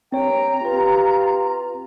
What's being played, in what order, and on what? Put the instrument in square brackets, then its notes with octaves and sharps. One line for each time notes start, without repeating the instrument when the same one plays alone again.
[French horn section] G2 A#3 [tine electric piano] C4 C#5 [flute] G5 [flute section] A#5
[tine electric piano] C4 B4 [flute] F4 [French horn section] G4